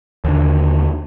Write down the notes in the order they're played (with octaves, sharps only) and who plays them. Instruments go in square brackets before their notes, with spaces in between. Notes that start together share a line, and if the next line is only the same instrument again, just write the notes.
[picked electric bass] D#2 D3